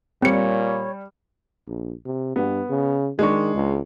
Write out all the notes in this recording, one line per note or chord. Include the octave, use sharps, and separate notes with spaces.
A#2 G3 C4 C#5 C#7
A#1
C3
G2 B3
C#3
D#3 G#3 D4 C#6
C#2